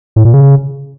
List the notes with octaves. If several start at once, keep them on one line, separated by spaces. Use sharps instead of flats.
A2
A#2
C#3